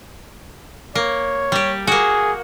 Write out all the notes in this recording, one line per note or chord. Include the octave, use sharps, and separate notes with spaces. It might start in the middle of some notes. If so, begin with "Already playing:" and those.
A#3 C#5
G3 G4
A#3 F#4 G#4